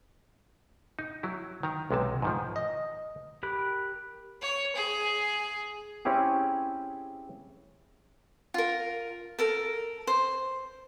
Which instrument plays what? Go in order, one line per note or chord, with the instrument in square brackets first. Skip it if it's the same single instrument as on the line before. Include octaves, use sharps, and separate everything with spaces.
[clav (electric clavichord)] D#4
F#3 E4
D#3 A#5
B1 C3 G#3 A5
G#2 D#3 F3
D#5
[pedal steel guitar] G4 A#4 B5 F#6
[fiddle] C#5
G#4
[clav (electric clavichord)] C4 C#4 E4 G4 G#4
[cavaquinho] F4 A#4
A4 A#4 A#5
C5